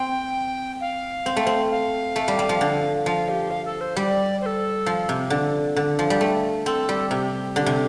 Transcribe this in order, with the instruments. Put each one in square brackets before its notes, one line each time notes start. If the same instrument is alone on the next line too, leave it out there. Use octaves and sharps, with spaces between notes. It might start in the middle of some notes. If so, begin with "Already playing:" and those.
Already playing: [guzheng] C4 [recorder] G5
[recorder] F5
[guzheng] C4
A3
C4
[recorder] F5
[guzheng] A3
G3
G3
F3
D3
[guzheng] F3 [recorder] F5
[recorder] G4
F5
A4
C5
[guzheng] G3 [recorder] D5
[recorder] C5
A4
[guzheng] F3
C3
D3
D3
F3
G3
A3
[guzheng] C4 [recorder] A4
[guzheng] G3
[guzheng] C3 [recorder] G4
[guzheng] D3
C3